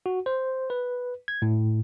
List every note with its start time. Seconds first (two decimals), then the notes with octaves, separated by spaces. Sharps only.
0.06 F#4
0.26 C5
0.70 B4
1.28 G#6
1.42 A2